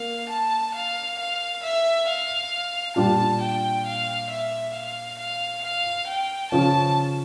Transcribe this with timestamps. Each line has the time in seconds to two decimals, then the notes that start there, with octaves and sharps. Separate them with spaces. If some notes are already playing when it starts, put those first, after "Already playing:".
Already playing: A#3 F5
0.29 A5
0.74 F5
1.19 F5
1.63 E5
2.07 F5
2.96 A#2 G3 D4 F4 A5
3.40 G5
3.86 F5
4.30 E5
4.74 F5
5.18 F5
5.63 F5
6.07 G5
6.51 C#3 F3 C#4 F4 A5